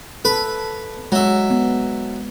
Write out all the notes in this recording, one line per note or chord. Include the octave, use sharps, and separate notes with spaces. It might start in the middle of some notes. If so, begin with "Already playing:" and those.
A4 B4 B5
F#3 G#3 E5
B3